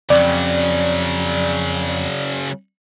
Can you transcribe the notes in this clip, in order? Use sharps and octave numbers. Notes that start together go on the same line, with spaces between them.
F2 C#3 F#3 D5